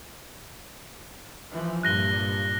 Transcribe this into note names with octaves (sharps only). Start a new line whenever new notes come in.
E3 F3
G2 A#2 F#6 A#6 G7